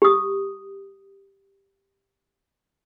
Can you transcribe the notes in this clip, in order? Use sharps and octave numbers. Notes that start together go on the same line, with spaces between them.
G4 D#6